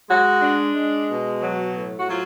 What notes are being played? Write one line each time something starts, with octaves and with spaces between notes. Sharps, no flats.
G#3 F#4
D4
G#3
B2
F#3
A2
F#4
F#3 F4